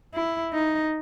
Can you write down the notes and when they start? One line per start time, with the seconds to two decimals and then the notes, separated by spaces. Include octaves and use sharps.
0.14 E4
0.53 D#4